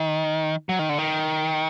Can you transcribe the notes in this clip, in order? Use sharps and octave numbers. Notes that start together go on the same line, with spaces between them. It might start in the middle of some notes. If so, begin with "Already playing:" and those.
Already playing: D#3
F#3
D#3
D3
D#3